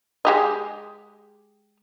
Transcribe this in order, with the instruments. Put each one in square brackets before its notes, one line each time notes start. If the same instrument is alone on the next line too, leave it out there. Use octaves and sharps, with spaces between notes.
[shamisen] G#3 G4 D#5